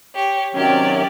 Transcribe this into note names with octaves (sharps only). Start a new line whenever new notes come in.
G4 C#5
C3 D#3 F#3 C#4 G4 D5